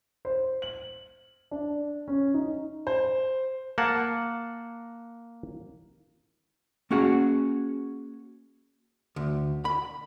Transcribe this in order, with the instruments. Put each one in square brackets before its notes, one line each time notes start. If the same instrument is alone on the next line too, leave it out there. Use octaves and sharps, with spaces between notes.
[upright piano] C5
F#7
D4
C#4
D#4
C5
[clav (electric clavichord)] A#3 F#5 A5
[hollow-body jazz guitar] A#3 C#4 F#4 G#4 F#5
D2
B5